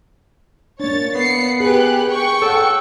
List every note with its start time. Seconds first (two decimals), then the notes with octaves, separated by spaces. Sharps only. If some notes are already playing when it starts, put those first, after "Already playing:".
0.80 A#3 D4 C#5 A6
1.15 B3 C7 C#7
1.60 G4 G#4 B4 F#6
2.08 G5 C#6
2.42 A4 C#5 F#5